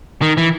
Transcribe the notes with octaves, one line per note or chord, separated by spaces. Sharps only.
D#3
E3